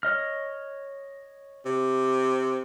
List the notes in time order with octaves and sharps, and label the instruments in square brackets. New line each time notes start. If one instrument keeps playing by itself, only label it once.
[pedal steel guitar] C#5 D#5 F6
[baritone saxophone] C3